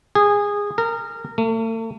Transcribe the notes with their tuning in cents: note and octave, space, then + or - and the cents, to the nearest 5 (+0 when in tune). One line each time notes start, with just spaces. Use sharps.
G#4 -20
A#4 -25
A3 +40